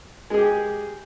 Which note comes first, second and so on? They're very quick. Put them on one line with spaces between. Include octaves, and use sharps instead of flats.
G#3 G#4 G4